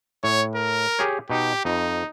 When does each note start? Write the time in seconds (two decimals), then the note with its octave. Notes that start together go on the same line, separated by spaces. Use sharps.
0.24 A2 C#5
0.55 A#4
0.99 G4 G#4 C#5
1.30 B2 D#4 G4
1.65 F2 D#4